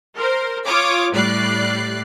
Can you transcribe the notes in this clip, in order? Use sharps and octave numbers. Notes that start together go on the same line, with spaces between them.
A#4 C5
F4 C#5 D6 D#6
A2 G3 D5 F#6 C7